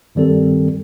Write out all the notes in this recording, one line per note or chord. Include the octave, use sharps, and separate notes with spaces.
G2 D#3 G3 C4 A4